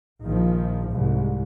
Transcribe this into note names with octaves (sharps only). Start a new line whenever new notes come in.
A#1 D#3 F3
C2 G#2